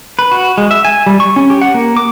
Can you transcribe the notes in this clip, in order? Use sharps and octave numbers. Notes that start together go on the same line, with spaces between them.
B4
F#4
G#3
E5
G#5
G3
C#6
C#4
G4
F#5
A#3
D6